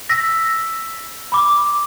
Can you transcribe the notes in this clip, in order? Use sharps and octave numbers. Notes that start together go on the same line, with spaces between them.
E6 A#6 B6
B5 D6